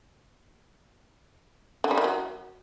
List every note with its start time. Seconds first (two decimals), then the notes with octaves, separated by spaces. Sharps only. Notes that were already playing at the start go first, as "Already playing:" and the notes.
1.84 D3
1.91 G3
1.98 D#3
2.04 F#3